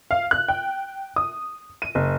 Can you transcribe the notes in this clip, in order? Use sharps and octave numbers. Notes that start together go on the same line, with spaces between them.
F5
F#6
G5
D#6
D#7
F#1